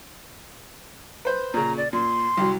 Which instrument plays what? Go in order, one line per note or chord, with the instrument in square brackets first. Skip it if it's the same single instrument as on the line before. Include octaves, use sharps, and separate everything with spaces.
[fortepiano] B4 C5
[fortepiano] A#2 C#3 [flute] A#5
[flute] D5
[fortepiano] A#2 [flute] C6
[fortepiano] C2 F#3